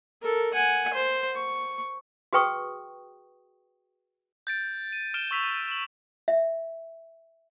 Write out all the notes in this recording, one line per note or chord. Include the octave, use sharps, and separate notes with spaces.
A4 A#4
F#5 G#5
C5
C#6
F#4 G#4 B4 G5 C#6 D#6
G6 A6 D7
D#7
F6 D7 E7 G7
C#6 E6 B6 F7
E7 F#7
E5